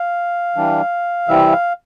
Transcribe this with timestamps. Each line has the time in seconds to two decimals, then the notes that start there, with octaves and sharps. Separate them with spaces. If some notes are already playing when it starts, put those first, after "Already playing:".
Already playing: F5
0.56 E3 G3 D4
1.28 C3 E3 G3 C4 E4 E5
1.52 F5